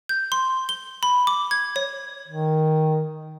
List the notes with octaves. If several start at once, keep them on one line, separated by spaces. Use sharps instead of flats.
G6
C6
G7
B5
D6
G#6
C#5
D#3